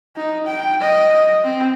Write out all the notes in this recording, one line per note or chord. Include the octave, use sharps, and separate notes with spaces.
D#4
G5
D#5
C4